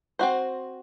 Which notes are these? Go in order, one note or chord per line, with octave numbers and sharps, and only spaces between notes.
C4 F#4 C5